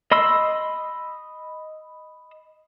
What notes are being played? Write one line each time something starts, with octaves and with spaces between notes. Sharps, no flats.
D#5 B5 C6 E6